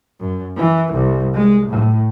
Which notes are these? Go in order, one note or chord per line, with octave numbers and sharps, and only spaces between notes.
F#2
E3
C2
G#3
A2